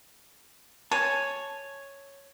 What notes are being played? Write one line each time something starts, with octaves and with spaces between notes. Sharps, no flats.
C#5 G#5 A5